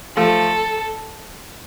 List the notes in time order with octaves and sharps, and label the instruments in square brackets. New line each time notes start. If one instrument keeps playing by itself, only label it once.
[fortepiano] F3 A3 [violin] A4